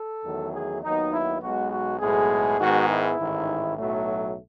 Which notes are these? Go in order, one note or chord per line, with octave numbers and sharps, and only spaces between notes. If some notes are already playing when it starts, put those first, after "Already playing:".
Already playing: A4
E2 D#3 F#3 A3
G#4
D#2 D#3 F#3 B3 D#4
E4
B1 B2 G#3 F#4
F#4
B1 A2 G#3 B3 G#4
G#2 D#3 G#3 B3 F#4
E4
A1 G#2 D#3
B1 A2 F#3 A3